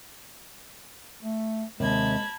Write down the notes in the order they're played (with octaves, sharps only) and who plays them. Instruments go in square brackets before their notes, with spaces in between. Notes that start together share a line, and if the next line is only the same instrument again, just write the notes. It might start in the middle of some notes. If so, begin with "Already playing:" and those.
[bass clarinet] A3
[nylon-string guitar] D#2 C3 [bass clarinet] G#3 [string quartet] A5 B5 G#6